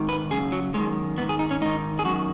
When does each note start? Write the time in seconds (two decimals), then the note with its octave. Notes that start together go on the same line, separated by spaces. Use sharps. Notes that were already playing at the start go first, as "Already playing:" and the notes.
Already playing: G#2 D#3
0.09 B4
0.31 F#2 C#3 G#4
0.52 F#3
0.74 F#2 D#3 G#3
1.18 G#2 D#3 B3
1.29 G#4
1.39 D#4
1.51 C#4
1.61 G#2 D#3 D#4
1.99 G#4
2.05 F#2 F#4
2.08 D#3